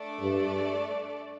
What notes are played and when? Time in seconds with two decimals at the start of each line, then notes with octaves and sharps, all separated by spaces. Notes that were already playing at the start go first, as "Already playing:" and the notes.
Already playing: A3 D4 A4 D5
0.20 G2